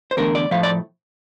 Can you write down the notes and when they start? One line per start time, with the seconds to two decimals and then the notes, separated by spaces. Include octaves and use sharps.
0.11 C5
0.17 E2 D3 A3 A#4
0.35 D5
0.51 A2 F3 A3 F5
0.63 D5